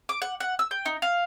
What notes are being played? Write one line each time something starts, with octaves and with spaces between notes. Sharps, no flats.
D6
F#5
F#5
E6
G5
D#4
F5